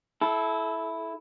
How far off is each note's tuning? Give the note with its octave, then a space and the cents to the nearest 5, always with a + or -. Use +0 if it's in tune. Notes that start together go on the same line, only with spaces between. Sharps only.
E4 +0 A4 -25